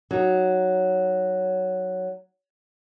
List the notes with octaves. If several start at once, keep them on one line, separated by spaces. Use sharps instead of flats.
F#3 D#4